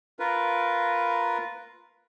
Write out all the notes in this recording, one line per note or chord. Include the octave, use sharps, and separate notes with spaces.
F4 A#4 B4